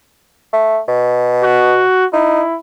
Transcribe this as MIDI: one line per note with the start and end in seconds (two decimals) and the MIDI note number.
0.53 0.79 57
0.88 1.82 47
1.43 2.05 66
2.13 2.42 63
2.13 2.57 64